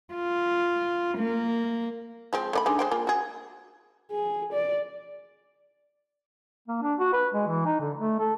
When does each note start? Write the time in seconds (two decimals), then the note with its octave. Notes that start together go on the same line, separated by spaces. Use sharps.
0.14 F4
1.18 A#3
2.33 F3 G#3 C4
2.53 A3 D5 B5
2.66 G#3 D4 D#4
2.79 G#3 C5 G5
2.91 A#3 F4 G#4
3.07 F#4 G#4
4.12 G#4
4.53 D5
6.68 A#3
6.82 D4
6.99 F#4
7.13 B4
7.34 G#3
7.47 E3
7.66 D#4
7.81 D3
7.98 A3
8.20 A4